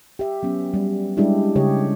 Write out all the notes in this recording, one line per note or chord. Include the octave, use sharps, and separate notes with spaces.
G4 E5
F#3 B3 C#4
G3
G3 G#3 D4 E4 G4
C#3 G4 C#5 D#5